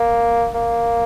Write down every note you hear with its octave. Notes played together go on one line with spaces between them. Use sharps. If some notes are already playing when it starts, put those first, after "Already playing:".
Already playing: A#3
A#3